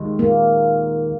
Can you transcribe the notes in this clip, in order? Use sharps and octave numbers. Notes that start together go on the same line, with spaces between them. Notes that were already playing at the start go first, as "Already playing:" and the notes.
Already playing: D#2 D#3 G#3
A#3